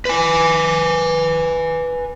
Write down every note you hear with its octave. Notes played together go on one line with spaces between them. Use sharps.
B4 G#5